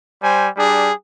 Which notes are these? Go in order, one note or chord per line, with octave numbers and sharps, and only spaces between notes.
G3 C5 G#5
G3 D4 G#4